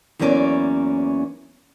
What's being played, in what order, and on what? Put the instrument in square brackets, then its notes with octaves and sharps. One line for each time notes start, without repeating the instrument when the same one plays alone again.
[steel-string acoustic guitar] E2 E3 F#3 A#3 C#4 D5